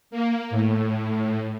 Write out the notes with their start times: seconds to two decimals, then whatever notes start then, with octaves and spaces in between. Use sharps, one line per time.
0.11 A#3
0.50 A2